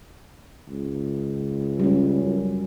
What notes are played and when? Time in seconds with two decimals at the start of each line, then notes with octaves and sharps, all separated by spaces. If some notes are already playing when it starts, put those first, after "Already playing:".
0.69 C#2
1.79 G3 C#4
2.23 F#2